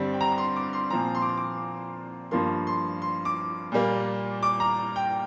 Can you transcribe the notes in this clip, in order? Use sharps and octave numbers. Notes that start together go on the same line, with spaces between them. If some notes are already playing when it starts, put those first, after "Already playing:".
Already playing: G2 D3 G3 C4
G5
A#5
A#5
C6
D6
C6
A#2 F3 C4 A#5
C6
D6
C6
D6
G2 F3 A#3 C6
C6
C6
D6
A#2 G3 A#3
D6
A#5
G5